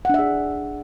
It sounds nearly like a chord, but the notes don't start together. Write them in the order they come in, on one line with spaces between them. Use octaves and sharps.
F#5 D4 E5 G#4